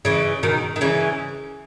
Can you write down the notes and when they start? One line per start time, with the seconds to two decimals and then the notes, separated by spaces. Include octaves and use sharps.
0.05 C#3 E3
0.43 B2 D#3
0.76 D#3
0.81 C#3 E3